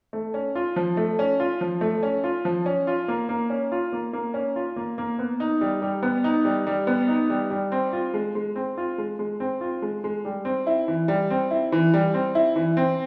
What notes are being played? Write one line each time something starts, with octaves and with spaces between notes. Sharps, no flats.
A3
C#4
F4
F3
A3
C#4
F4
F3
A3
C#4
F4
F3
C#4
F4
A#3
A#3
C#4
F4
A#3
A#3
C#4
F4
A#3
A#3
B3
D#4
G3
G3
B3
D#4
G3
G3
B3
D#4
G3
G3
C4
F4
G#3
G#3
C4
F4
G#3
G#3
C4
F4
G#3
G#3
G3
C4
E4
E3
G3
C4
E4
E3
G3
C4
E4
E3
C4